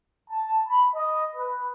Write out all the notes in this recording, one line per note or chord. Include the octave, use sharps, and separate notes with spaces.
A5
B5
D#5
B4